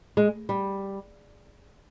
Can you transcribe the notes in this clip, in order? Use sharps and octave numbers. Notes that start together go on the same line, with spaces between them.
G#3
G3